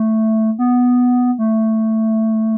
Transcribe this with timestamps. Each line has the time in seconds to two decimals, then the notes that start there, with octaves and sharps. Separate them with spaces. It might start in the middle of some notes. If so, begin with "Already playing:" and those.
Already playing: A3
0.59 B3
1.39 A3